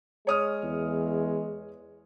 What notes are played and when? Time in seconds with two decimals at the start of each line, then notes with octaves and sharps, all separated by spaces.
0.27 G#3 C#5 D#6 F6
0.63 E2